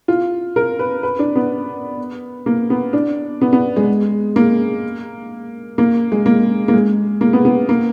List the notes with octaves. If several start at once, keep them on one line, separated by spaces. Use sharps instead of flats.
F4
A#4
B4
B4
D4
B3
A#3
B3
D4
B3
B3
G#3
A#3
A#3
G#3
A#3
A#3
G#3
A#3
B3
B3
A#3